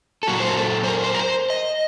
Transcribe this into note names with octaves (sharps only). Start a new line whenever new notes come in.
A4
A#2 F#3 A#3 F#4
C5
A#4
A4
C5
A#4
C5
A#4
C5
D#5